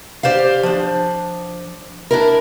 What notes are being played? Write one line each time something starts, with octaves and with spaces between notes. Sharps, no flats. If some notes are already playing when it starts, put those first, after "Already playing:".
G4 C5 D5 F5
F3 D4
D4 E4 A#4